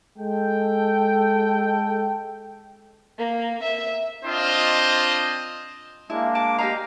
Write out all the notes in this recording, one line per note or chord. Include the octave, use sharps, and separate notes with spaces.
G#3 A4 G5
A#3
E5
C4 D4 F4 C5 D#5
G#3 A#3 D4 E4
A5 D6
G4 D#5 F5 A#5